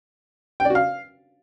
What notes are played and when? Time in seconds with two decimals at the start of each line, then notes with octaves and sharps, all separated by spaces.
0.60 G5
0.65 D5
0.70 F#4
0.75 F5